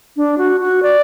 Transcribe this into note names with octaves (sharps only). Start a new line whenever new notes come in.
D4
F#4
F#4
D5